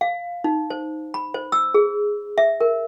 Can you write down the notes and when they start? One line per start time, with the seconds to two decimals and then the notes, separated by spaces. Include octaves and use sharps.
0.01 F5
0.44 D#4
0.70 C5
1.14 B5
1.34 C5
1.52 E6
1.74 G#4
2.38 E5
2.61 A#4